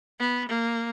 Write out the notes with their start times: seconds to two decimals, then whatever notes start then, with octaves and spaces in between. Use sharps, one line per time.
0.20 B3
0.49 A#3